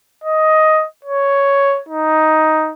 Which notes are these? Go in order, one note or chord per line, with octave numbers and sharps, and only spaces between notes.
D#5
C#5
D#4